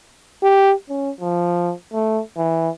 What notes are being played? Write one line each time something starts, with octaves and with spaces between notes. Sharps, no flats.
G4
C#4
F3
A3
E3